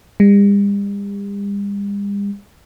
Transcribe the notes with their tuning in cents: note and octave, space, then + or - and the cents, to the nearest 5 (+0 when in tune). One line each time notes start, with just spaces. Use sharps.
G3 +45